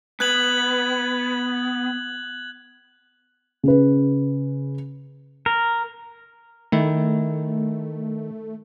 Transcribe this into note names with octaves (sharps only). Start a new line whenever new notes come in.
B3 F#6 G#6 F#7
C#3 B4
A#4
D#3 A3 E4